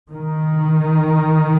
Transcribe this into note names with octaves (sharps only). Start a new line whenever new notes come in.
D#3